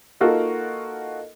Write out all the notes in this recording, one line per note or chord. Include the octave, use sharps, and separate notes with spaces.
A#3 D#4 F4 F#4 A4 A#4